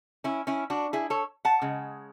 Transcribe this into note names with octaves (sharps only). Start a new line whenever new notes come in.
C#4 E4
C#4 E4
D4 F#4
E4 G#4
A4 C#5
F#5 A5
C#3 G#3